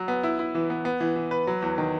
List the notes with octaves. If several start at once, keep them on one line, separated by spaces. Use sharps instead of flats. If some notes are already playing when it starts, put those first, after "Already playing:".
Already playing: F#3
B3
E4
E4
E3
B3
B3
E3
E3
B4
F#3
E2
D#3